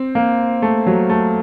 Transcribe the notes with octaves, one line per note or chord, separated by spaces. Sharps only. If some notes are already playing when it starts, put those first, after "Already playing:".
Already playing: C4
A#3
A3
F#3
A3